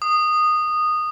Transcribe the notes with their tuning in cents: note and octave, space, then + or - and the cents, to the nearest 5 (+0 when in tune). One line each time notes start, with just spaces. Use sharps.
D#6 -15